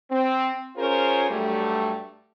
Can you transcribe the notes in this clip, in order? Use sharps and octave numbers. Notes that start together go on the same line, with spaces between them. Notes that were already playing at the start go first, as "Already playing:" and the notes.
C4
C#4 F4 G#4 A#4 C5 C#5
G2 F#3 G3 A3